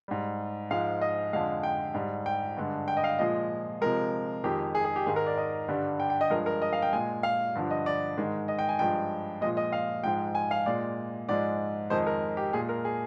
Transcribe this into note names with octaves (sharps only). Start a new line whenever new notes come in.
G#2 G3
G#2 F3 G#3 F5
D#5
F2 D3 G#3 F5
G5
G#2 G3
G5
G2 D3 G#3
G5
D#5
F5
A#2 F3 G#3 D#5
C3 F3 G#3 A#4
F2 D#3 G#3 G4
G#4
G#4
G4
G#2 D#3 G#3 G#4
A#4
D5
D#5
G2 D3 G3
G5
G5
D#5
G2 F3 G#3 A#4
A#4
D#5
F5
G5
A#2 G#3 G#5
F5
G2 D3 F3
D#5
D5
G#2 D#3 G#3
D#5
G5
G#5
G2 F3 G#3 G5
A#2 F3 G#3 D#5
D#5
F5
G#2 F3 G#3 G5
G#5
F5
A#2 G#3 D5
G#2 F3 G#3 D5
F2 D#3 G#3 C5
A#4
G4
A#2 G#3 G#4
A#4
G#4